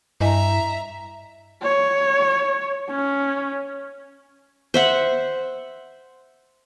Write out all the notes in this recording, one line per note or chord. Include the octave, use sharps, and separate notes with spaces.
G2 E4 D#5 E5 G#5 A#5
C#5
C#4
C5 E5 F#5